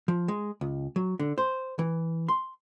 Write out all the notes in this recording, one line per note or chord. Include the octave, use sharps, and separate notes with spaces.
F3
G#3
C#2
F#3
D3
C5
E3
C6